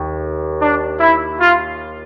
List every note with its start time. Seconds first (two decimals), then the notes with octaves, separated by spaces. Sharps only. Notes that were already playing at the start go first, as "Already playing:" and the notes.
Already playing: D#2
0.61 D4
1.00 E4
1.39 F4